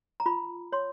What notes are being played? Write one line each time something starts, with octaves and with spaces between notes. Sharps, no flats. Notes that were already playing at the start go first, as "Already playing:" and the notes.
A#5
F4 B5
C#5 C6